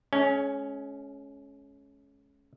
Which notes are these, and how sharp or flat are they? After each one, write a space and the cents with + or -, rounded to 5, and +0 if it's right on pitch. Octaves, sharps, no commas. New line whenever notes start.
G#3 +40 C#4 +0